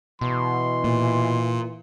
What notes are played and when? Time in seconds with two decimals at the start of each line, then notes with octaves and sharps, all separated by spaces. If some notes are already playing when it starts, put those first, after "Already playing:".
0.21 B2 E3 C6
0.84 A#2